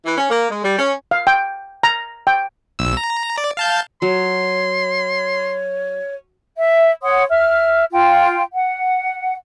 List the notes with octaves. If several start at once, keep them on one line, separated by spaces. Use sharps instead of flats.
E3
C#4
A#3
G#3
G3
C#4
F5
G5
A#5
G5
B1 E6
A#5
D5
F5 A5 G6
F#3 C#5 C6
E5
C#5 F#5 C6 D#6
E5 F6
F4 G5
F#5